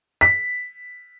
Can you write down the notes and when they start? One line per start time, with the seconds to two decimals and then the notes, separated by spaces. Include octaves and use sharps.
0.21 B6